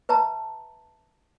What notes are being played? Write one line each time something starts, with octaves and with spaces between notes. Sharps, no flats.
B4 E5 A5 A#5